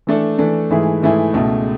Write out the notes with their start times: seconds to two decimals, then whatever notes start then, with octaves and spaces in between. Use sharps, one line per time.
0.07 E3 A3 D4 A4
0.39 E3 A3 D4 A4
0.70 G#2 E3 A3 E4 G#4
1.02 G#2 E3 A3 E4 G#4
1.34 C#2 B2 A3